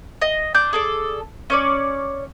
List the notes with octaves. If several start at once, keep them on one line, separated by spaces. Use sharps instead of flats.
D#5
D4 G6
G#4 A4 D5
C#4 C#5 D5